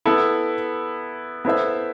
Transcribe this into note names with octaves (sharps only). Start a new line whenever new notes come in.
B3 E4 A4
B3 E4 A4 C5 E5